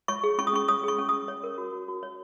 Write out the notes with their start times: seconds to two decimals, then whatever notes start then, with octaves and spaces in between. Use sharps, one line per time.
0.08 C#5 C#6
0.24 G#4
0.38 C#4 C#6
0.47 D#6
0.53 C#4 C#6
0.68 C#5 D#6
0.83 G#4 C#6
0.98 C#4
1.09 C#4 D#6
1.28 C#5
1.44 A#4
1.58 F#4
1.73 F#4
1.88 F#4
2.03 C#5